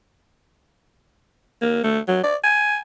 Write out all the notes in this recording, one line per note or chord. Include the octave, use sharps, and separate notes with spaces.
A#3
A3
F#3
D5
G#5